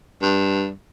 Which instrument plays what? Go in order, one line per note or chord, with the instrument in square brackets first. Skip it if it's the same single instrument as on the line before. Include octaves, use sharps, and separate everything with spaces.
[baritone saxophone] G2